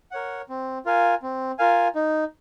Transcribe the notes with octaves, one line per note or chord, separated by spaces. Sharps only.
A#4 C#5 F#5
C4
F4 A#4 F5 G#5
C4
F4 A#4 F5 G#5
D#4